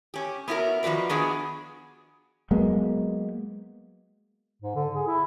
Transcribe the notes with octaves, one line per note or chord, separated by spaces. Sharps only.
C#4 G4
B3 C#4 E4 F#4 A#4
D#3 F3 F#4 B4 D5
D#3 B3 D4 F#4 G#4 D5
F#3 G#3 A#3 B3
G#2
D3
G#4
E4